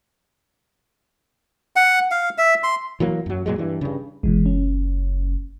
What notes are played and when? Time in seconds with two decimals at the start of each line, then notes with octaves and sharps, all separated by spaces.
1.76 F#5
2.11 F5
2.38 E5
2.63 C6
3.00 E3 F#3 A#3
3.26 F#2 F#3
3.46 A#2 D3 F#3 G#3
3.58 G2 E3
3.81 G2 C#3
4.23 F#1 B2 E3 G#3
4.46 C#4